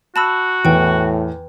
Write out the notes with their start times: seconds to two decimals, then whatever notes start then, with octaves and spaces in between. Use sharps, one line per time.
0.16 F#4 A5 B5 E6
0.65 E2 A2 B4 G5